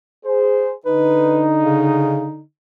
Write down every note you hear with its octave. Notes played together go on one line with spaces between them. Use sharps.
G#4 C5
D3 D#4 B4
C#3